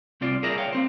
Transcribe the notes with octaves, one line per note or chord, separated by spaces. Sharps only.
C2 C4 F4 D5
G#4 A#4 D5 E5 A#5
C#5 F5 G5
A#3 C4 C5